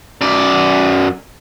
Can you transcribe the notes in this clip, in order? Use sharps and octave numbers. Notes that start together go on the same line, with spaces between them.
F#2 D5